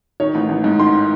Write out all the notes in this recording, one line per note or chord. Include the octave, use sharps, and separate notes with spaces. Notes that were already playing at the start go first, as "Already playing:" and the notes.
D#3 C#5
A1
A1
G#2
D#3 C6